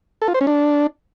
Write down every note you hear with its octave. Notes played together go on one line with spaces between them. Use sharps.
A4
F4
C5
C#4
D4